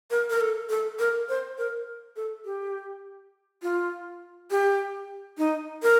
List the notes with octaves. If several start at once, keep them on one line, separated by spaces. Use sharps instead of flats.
A#4
A#4
A4
A4
A#4
C5
A#4
A4
G4
F4
G4
D#4
A#4